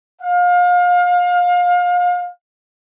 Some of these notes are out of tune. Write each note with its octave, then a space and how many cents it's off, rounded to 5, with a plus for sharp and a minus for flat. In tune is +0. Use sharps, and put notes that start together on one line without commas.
F5 +30